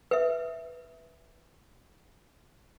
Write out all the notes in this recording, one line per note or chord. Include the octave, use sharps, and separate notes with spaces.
B4 E5